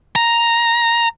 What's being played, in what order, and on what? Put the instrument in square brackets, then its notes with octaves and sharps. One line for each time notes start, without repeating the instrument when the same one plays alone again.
[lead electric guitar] A#5